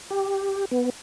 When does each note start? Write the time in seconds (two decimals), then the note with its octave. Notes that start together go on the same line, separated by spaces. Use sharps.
0.10 G4
0.71 B3